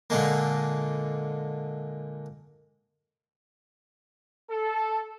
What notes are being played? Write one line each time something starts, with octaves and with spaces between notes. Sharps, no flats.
A#2 D3 G#3 A#3
A4